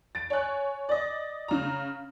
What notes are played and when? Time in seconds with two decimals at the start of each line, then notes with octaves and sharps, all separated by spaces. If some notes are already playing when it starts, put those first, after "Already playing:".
0.15 A6 D7
0.30 C#5 G#5 F#6
0.89 D5 D#5
1.48 C#3 A#5